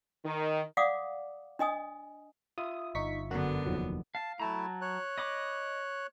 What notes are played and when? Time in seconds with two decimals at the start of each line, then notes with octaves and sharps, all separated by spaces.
0.24 D#3
0.77 D5 F5 F#5 D6 D#6
1.59 D4 D#5 G#5 D#6
2.58 F4 E5 D#6
2.95 G1 D#4 C#6 B6
3.31 F#2 D3 B3 F#4 A#4 F#6
3.66 F1 D#2 D#3 F3 F#3
4.15 F5 A5
4.40 F#3 A3 E4 A5 A#5
4.81 C#5 F#6
5.18 D#5 B5 D6